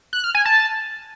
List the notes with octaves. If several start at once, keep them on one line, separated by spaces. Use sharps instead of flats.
F#6
F6
G#5
A5